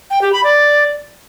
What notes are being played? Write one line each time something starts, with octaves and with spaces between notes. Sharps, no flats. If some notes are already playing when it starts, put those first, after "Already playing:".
G5
G4
B5
D5